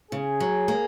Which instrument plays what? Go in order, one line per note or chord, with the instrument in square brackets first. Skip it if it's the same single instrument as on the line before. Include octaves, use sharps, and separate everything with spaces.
[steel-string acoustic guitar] C#3 [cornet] G#4
[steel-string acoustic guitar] F#3
A#3